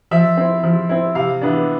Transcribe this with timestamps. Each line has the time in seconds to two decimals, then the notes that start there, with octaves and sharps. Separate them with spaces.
0.11 F3 E5
0.37 C4 E4
0.63 F3
0.89 C4 E4
1.15 C3 F5
1.41 E3 B3 D4